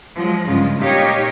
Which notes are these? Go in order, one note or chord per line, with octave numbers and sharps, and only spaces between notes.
F3 F#3 G#3
G2 C#3 G#3 F4
A#2 D#4 G4 C#5 F5